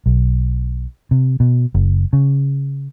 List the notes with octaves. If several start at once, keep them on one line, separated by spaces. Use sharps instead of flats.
B1
C3
B2
F#1
C#3